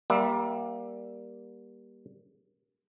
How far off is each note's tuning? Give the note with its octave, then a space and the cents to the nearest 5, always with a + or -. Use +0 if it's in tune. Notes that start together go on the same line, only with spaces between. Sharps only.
G3 +0 A#3 +20 E5 +0